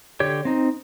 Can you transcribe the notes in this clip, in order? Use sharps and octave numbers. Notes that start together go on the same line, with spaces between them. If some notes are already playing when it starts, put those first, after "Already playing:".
D3 G4 C#5
C4 D#4